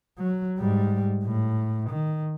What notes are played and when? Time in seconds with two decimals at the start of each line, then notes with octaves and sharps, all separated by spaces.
0.18 F#3
0.58 G#2 G3
1.24 A2
1.90 D#3